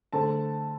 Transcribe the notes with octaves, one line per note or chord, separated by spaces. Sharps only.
D3 A3 C4 A5